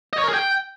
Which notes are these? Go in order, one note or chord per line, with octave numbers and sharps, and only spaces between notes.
D#5
C#5
A#4
G#4
G5